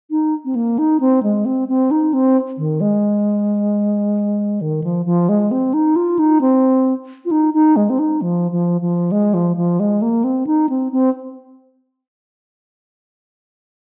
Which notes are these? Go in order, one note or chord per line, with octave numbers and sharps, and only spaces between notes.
D#4
C4
A#3
D#4
C4
G#3
C4
C4
D#4
C4
D#3
G#3
D#3
F3
F3
G#3
C4
D#4
F4
D#4
C4
F4
D#4
D#4
G#3
C4
D#4
F3
F3
F3
G#3
F3
F3
G#3
A#3
C4
D#4
C4
C4